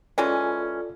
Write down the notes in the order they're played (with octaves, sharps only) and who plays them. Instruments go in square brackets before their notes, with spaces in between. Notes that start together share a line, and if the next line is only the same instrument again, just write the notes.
[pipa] E3 G#3 C#4 [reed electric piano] F4 A4 D5